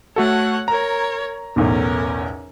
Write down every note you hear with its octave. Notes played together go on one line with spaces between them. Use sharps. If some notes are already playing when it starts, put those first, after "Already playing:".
A3 F#4 A4 C#5 F#5
A#4 C#5 A#5
B1 E2 A2 C#4 A#4